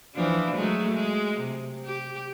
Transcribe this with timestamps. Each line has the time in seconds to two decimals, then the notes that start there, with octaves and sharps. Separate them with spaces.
0.15 E3 F3 D4
0.55 F#3 G#3 A3
0.94 G#3
1.41 C3
1.86 G4